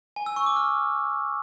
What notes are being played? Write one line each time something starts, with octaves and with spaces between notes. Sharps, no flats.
G#5
E6
C#6
D6
F6